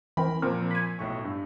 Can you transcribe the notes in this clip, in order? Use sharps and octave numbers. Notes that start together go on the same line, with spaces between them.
E3 C4 A#4 B5
A#2 F3 C4 A#4
G#5 B5
B1 A2 C#6
G2